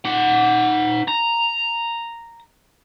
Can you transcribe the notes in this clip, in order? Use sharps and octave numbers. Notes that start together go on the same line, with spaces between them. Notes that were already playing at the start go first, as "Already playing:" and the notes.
D#4 F#5
A#5